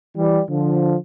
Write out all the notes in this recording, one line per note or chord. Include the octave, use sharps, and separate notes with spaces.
E3 G3
D3 F3